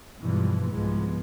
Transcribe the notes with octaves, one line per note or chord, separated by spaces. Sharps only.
G2 B2 E3 F3 G3 G#3
C2 G#2 F3 G#3 B3